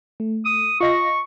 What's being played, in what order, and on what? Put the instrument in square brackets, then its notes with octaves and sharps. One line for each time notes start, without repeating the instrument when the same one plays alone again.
[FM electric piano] A3
[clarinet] D#6
[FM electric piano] F4 D#5 A#6 [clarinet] C#6